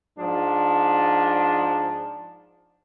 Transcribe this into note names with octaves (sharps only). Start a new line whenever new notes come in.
G#2 F3 D4